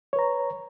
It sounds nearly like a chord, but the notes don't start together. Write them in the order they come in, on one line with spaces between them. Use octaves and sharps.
C#5 B4 A#5